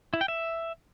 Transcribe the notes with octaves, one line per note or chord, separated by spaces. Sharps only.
E4
G5
E5